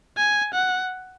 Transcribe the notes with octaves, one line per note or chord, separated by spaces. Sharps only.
G#5
F#5